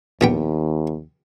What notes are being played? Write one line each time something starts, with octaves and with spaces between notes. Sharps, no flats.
A#1 D#2 B3 G5